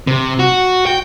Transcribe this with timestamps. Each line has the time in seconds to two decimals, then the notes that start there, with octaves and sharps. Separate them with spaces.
0.07 C3
0.39 F#4
0.86 G5